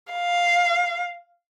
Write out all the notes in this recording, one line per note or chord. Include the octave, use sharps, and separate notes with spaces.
F5